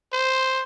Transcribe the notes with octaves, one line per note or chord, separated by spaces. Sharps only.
C5